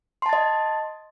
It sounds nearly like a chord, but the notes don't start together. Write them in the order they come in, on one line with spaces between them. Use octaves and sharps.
C6 A5 A6 D#5